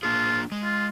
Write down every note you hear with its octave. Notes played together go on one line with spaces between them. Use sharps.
A#3 D4 F4 G#4
G#3
F4